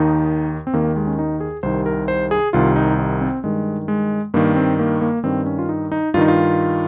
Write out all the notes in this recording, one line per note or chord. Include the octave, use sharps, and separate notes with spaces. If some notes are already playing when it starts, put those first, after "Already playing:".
Already playing: D#2 D#3 D#4
C4
D#2 D#3 A#3
G#3
C#4
D#4
G#4
C2 C3 D#3 C5
A#4
C5
G#4
C2 C3 D#3 F4
D#4
D#4
C4
G2 D#3 G#3
G#3
G2 D#3 A#3
C4
A#3
A#3
G2 D#3 C4
C#4
F4
D#4
D#4
G2 D#3 D#4 F4
F4